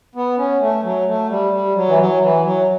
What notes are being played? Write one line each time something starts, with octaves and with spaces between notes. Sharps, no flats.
B3
C#4
A3
F#3
A3
G3
G3
F#3
E3
F#3
E3
F#3